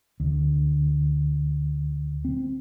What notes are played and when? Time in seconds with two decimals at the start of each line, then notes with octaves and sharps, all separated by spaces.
0.20 D2
2.25 C4